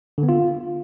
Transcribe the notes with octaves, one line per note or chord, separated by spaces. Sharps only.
D3
B3
F4